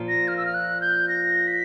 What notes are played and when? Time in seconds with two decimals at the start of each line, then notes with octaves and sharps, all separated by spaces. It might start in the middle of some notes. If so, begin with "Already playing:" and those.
Already playing: A#2 F3 A#3
0.08 A#6
0.28 F6
0.37 E6
0.46 F6
0.54 F#6
0.81 G6
1.08 A#6
1.47 B6